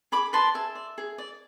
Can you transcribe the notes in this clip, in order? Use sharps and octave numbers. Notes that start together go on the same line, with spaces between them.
G#4 B5 D6
B4 D5 A5 C6
G#4 E5
D5
G#4
D5